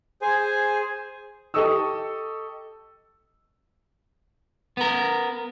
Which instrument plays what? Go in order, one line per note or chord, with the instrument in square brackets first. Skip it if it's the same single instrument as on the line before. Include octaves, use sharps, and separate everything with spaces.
[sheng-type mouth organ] G#4 C5 G#5
[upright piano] G4 A4 D#5 C#6 D#6 E6
[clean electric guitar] B3 A#4